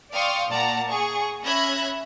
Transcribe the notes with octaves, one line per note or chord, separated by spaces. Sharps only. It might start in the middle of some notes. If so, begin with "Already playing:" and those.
D5 F5 G5 C6 C#6 D#6
A#2 D5 F#5 A5 A#5
G#4 C#6
C#4 E5 B5 F#6 G#6 A#6